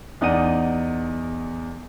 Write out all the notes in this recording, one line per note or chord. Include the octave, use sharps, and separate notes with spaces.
E2 D#4 D5 F#5 D#7